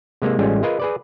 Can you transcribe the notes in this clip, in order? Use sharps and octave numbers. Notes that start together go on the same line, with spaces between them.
C3 G#3 A#3
A1 G3 G#3 C#4 F4
F4 G#4 A#4 B4 D#5 G#5
G#4 B4 D5